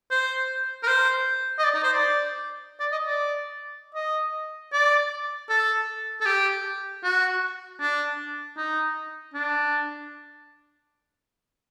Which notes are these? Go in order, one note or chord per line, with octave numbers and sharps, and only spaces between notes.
C5
A#4
C5
D#5
D5
D#4
C5
D5
D5
D#5
D5
D#5
D5
A4
A4
G4
F#4
D4
D#4
D4